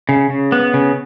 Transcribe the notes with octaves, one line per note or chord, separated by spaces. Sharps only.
C#3
C#3
B3
C#3